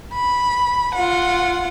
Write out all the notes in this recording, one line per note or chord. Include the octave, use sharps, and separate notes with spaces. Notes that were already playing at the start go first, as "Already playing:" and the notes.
B5
F4 F#5